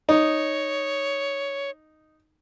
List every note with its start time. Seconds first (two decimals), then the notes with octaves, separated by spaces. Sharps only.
0.09 D#4 C#5